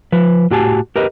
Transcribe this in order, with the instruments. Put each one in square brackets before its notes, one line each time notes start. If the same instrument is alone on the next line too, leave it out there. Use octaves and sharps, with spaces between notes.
[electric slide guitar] F3 B4
A2 F#4 G4 G#5 A5
G4 A#4 B4 D#5